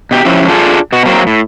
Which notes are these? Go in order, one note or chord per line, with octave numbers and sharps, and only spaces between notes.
B2 G4
F3 C#4 E4 G4
D4 F4 G#4 A4
B2 F#4
F#3 A#3 C4
A2